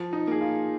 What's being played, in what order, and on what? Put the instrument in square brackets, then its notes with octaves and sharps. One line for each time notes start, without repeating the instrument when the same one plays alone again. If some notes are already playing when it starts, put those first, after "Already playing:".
Already playing: [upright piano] F3
[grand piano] D#4
[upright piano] A#3 [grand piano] G#4
[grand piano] F4